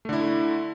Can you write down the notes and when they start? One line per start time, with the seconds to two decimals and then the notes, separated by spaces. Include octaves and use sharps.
0.05 A3
0.09 D3
0.13 E4